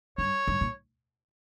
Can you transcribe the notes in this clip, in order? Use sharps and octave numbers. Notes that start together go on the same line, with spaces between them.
G2 C#5
G2
A#2